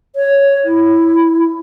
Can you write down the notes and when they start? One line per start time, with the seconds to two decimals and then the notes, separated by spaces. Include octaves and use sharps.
0.16 C#5
0.65 E4